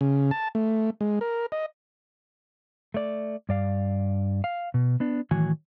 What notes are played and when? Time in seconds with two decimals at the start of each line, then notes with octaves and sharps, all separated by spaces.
0.01 C#3
0.31 A5
0.55 A3
1.01 G#3
1.21 A#4
1.52 D#5
2.94 A3 D5
3.49 G2 D5 F5
4.44 F5
4.74 B2
5.00 B3 D4
5.31 A2 D#3 E3 F#3 F#4 G#5